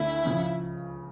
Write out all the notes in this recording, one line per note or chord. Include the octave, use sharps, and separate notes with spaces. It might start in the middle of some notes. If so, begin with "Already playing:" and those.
Already playing: D2 D3 A3 D4 E4
C#2 C#3 F3